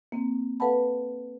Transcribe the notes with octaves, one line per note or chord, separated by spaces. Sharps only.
A#3 C4
A4 B4 F5 F#5 A5 B5